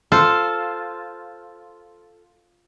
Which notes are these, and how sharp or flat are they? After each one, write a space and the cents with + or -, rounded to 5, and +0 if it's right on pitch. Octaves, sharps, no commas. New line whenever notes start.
F4 +0 A4 +0 C5 +0